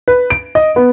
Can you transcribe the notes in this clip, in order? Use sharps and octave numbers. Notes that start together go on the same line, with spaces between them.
B4
D7
D#5
B3